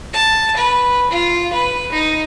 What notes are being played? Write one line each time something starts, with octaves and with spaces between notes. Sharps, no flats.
A5
B4
F4
B4
D#4